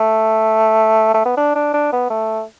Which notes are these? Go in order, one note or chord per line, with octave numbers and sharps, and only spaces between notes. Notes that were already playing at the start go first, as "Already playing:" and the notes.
Already playing: A3
A3
B3
D4
D4
D4
B3
A3